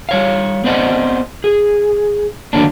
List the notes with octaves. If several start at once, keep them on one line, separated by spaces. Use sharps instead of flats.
G3 C#5 F5
B3 C4 C5 D5 D#5 F#5
G#4
D3 D#3 F#3 A#3 D4